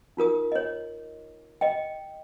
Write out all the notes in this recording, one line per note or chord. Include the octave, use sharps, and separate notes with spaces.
D#4 F4 A#4 D#6
C#5 D#5
D#5 G5